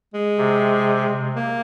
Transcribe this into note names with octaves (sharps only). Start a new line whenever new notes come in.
G#3
C3
A#3